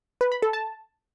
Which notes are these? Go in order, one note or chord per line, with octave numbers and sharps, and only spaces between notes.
B4
B5
A4
A5